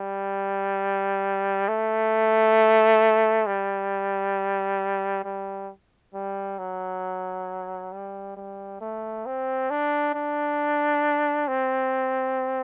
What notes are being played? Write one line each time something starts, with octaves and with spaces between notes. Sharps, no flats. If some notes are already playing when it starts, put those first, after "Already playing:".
Already playing: G3
A3
G3
G3
G3
F#3
G3
G3
A3
C4
D4
D4
C4